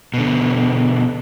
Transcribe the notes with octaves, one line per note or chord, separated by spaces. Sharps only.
B2 D3